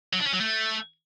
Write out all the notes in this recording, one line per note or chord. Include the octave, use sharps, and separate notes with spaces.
F#3
D4
C#4
F#3
A3